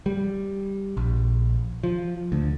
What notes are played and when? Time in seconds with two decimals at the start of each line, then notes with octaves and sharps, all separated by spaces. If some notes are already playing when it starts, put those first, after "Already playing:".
0.06 G3
0.97 A#1
1.83 F3
2.32 D2